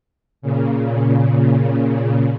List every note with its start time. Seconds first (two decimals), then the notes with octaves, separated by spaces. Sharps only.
0.42 A#2 C#3